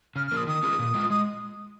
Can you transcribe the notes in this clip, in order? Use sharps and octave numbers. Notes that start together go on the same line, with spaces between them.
C#3 F6
F6
F3 A#3 D#6
D#3 D#6
C#4 F4 G#4
A#2
G#3 F4
G#3 D#6